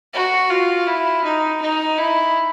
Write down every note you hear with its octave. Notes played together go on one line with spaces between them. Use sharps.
F#4
F4
E4
D#4
D#4
E4